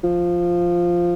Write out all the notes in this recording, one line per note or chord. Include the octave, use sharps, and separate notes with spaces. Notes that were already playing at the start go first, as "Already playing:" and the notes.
F3